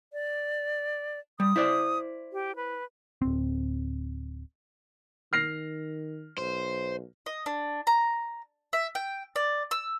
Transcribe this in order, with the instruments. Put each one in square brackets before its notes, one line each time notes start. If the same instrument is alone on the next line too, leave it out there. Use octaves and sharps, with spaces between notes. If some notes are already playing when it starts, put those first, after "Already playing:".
[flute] D5
[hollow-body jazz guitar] G3 [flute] D#6
[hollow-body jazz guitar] E4 C5 D5
[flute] G4
B4
[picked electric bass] D1 C4
[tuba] D#3 [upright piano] F6 A#6 C7
[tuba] B1 [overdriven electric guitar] C5
[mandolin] D#5
D4
A#5
E5
G5
D5
E6